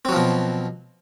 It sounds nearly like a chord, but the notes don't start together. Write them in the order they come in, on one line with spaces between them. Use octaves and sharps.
C4 F#3 F3 B2